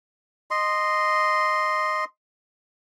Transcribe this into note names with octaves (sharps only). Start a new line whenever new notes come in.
D#5 C6